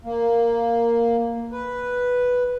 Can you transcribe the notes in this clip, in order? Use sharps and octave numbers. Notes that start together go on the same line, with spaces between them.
A#3
B4